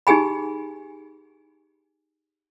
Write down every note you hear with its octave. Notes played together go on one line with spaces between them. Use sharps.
D#4 G4 G#4 G#5 B5